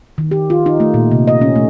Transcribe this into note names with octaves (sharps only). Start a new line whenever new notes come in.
D#3
G4
F4
D#4
A3
A#2
C3
D#5
C#4
A3